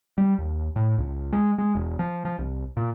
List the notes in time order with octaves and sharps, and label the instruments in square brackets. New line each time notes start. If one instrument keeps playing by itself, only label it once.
[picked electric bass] G3
D#2
A2
C#2
G#3
G#3
E1
F3
F3
C2
A#2